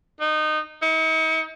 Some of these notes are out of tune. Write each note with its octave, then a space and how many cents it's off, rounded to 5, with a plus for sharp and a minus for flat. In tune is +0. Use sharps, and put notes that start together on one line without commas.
D#4 -20
D#4 +45